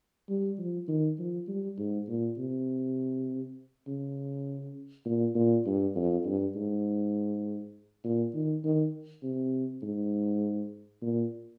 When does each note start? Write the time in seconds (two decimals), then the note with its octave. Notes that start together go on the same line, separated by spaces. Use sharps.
0.29 G3
0.59 F3
0.88 D#3
1.19 F3
1.48 G3
1.78 G#2
2.08 A#2
2.37 C3
3.87 C#3
5.05 A#2
5.35 A#2
5.66 G2
5.96 F2
6.26 G2
6.56 G#2
8.04 A#2
8.34 D#3
8.64 D#3
9.23 C3
9.82 G#2
11.02 A#2